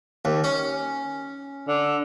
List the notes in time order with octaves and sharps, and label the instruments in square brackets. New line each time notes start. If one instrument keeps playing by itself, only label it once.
[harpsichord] D#2
C#4
[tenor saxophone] D3